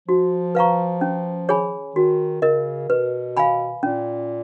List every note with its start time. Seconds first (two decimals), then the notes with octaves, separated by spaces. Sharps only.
0.08 F3 F#4
0.55 B4 F5 A#5 C#6
1.01 C#4
1.49 G#4 C#5 G#5 B5
1.95 D#3 F#4
2.42 C#3 A#4 D#5
2.89 B2 B4
3.37 F5 G#5 B5
3.83 A#2 C#4